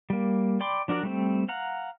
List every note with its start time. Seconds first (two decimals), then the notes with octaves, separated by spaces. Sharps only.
0.10 G3 A#3
0.60 D5 G5 B5 C6 D6
0.88 F3 D4 F#4 A#4 D5
1.03 G3 A3 C4
1.48 F5 F#5 A#5